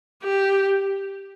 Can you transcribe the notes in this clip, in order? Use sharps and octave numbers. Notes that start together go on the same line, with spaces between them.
G4